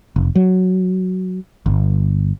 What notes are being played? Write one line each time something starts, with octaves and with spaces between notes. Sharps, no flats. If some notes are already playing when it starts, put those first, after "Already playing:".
F1
F#3
G1